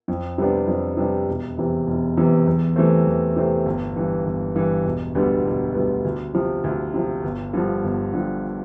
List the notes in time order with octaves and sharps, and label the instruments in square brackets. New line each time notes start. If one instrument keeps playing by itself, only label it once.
[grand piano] F2
C3 G3 B3 D4
F2
C3 G3 B3 D4
E1
E2 C3 E3
E1
E2 C3 E3
E2
C3 E3 A3 C4
E2
C3 E3 A3 C4
G1
G2 E3
G1
G2 E3
E1
D2 D3 G3 B3
E1
D2 D3 G3 B3
D2
C3 F3
D2
C3 F3
G1
G2 D3 F3
G1
G2 D3 F3